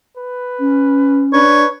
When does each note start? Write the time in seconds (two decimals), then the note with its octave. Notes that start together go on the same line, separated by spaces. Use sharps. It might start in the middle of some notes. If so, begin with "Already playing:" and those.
0.17 B4
0.59 C#4
1.33 D4 B4 C#5